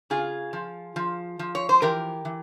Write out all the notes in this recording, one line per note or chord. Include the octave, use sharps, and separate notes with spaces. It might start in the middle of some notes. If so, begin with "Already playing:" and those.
C#3 F4 G#4
F3
F3
F3
C#5
C5
E3 G4 A#4
E3